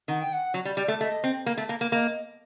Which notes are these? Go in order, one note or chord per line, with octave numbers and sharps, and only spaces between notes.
D#3 F#5
G5
F#5
F#3
G3
G3
A3
A3 D#5
C4
A#3
A3
A#3
A#3
A#3 D#5